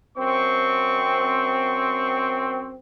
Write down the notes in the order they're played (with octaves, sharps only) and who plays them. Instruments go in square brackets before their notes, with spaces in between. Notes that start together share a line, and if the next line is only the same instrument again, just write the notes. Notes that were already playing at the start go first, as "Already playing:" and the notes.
[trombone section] F#2 C4 [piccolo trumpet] C#6